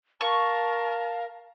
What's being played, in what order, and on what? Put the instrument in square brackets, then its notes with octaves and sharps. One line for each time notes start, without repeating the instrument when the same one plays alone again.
[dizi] A#4 [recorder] F5 [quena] A5 [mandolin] C#6